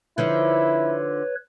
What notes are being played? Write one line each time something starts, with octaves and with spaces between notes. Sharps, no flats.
D3 F3 D#4 E4 B4 C#5